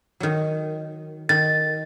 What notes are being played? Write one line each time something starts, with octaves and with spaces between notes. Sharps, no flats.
D#3 F#3
D#3 A6